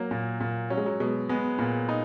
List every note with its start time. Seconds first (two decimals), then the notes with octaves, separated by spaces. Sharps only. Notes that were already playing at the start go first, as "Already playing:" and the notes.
Already playing: F#3 A#3
0.11 A#2
0.40 A#2
0.70 F#3 C#4
0.77 G#3
0.86 F#3
1.00 B2 G#3
1.29 G#3 B3
1.59 A#2
1.89 D#4